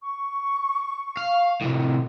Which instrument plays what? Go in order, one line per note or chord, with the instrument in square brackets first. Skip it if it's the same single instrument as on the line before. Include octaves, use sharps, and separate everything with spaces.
[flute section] C#6
[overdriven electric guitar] F5
A2 C3